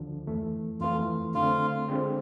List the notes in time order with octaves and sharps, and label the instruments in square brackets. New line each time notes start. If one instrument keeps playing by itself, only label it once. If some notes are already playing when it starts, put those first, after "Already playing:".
Already playing: [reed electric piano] D2 D3 F3
F2 E3 A3
[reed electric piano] F2 E3 A3 [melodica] F4
[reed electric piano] D3 A3 C4 [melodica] F4
[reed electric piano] D3 G#3 C4 F4